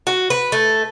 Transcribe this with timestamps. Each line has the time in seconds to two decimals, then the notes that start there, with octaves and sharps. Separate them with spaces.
0.07 F#4
0.30 B4
0.52 A3